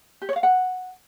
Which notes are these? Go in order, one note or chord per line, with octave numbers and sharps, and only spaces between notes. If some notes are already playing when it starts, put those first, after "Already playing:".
G4
C#5
F5
F#5